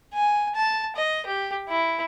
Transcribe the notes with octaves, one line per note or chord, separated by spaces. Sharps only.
G#5
A5
D#5
G4
E4